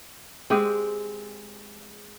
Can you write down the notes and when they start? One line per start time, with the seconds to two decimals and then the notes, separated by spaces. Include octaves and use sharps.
0.50 G#3 C4 G4 G#4